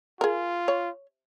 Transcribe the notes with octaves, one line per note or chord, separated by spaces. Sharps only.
F4 G#4 A#4
C#5